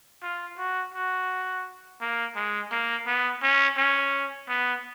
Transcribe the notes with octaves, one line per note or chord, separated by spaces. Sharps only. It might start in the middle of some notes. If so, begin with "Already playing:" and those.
F4
F#4
F#4
A#3
G#3
A#3
B3
C#4
C#4
B3